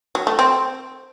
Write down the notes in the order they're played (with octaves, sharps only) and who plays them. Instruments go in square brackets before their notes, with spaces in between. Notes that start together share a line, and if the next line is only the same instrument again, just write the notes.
[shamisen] F#3
A3
C4